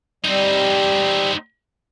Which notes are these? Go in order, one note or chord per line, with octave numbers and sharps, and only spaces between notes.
G3 C4 D#4